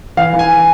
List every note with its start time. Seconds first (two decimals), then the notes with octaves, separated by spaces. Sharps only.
0.17 E3 F5
0.33 E3
0.39 G#5